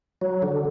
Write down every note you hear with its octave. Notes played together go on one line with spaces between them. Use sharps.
F#3
D3